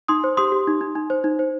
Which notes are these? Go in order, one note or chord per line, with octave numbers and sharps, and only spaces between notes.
D#4 C6 D#6
C5
G4 C6 D#6
G4
D#4
D#4
D#4
C5
D#4
C5